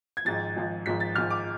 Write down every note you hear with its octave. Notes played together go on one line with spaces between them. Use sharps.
G#6
G#1 G#2 F3 A6
G#1 G#2 F3
G#1 G#2 F3 B6
A6
G#1 G#2 F3 F6
D6